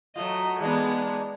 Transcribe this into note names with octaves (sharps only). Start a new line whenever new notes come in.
F#3 A3 F4 D#5
E3 G#3 B3 D4 D#4